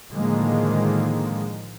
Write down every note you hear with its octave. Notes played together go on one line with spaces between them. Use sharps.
A2 D3 D#3 F3 G#3 A#3